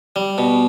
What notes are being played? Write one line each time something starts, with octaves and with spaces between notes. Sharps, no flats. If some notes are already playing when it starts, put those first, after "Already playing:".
G3
B2